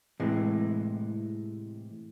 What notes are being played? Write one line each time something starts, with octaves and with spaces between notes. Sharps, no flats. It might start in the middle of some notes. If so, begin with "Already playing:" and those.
A2 C3 E3 G#3